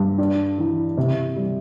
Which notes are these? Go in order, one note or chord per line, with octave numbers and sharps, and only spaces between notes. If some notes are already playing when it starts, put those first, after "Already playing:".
Already playing: G2
D4
E3
C3
G3